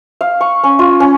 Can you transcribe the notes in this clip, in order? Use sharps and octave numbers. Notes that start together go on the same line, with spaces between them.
F5
C#6
C#4
F4
C#4